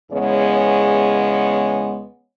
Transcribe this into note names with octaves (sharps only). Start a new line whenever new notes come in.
E2 C#3 G#3 B3 C#5